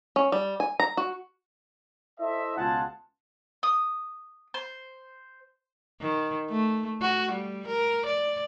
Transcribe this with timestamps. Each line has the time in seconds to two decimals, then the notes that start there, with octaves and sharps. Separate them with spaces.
0.16 C#4
0.32 G3
0.60 G#5
0.80 A#5
0.97 F#4
2.20 E4 A4 C5 D#5 E5
2.57 C#2 B2 F4 G#4 F#5 A5
3.63 D#6
4.54 C5
6.01 D#3
6.50 A3
7.02 F#4
7.32 G3
7.67 A#4
8.06 D5